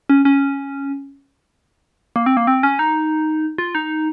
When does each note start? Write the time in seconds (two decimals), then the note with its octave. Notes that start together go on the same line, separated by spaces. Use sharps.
0.10 C#4
0.25 C#4
2.16 A#3
2.26 C4
2.37 A#3
2.47 C4
2.63 C#4
2.79 D#4
3.58 F4
3.75 D#4